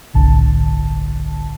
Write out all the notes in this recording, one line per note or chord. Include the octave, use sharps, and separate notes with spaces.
G1 C2 A2 D3 A5